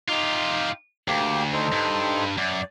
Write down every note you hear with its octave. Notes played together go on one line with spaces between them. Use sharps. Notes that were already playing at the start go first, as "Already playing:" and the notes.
D#4 F4 G4 F5 D6
D2 A#3 G4 G5
D#4 A4 C5
G2
F#2 D5